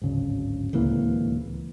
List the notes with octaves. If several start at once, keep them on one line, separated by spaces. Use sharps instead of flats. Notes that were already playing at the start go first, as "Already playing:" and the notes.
D1 G#1 C#3
D1 C#2 E3 A#3